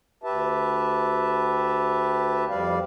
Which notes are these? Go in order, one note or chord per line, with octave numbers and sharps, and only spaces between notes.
D2 G4 B4 E5 A5
F2 G3 D5 F5